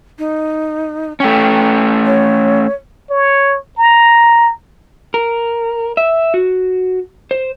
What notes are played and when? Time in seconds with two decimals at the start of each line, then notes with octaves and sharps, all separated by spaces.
0.18 D#4
1.20 A3 C#4 G5
2.06 C#5
3.11 C#5
3.78 A#5
5.14 A#4
5.97 E5
6.34 F#4
7.31 C5